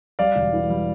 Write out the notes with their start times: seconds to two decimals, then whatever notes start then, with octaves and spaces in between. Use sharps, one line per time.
0.19 G3 D5 F5
0.35 E1
0.53 E3
0.70 G3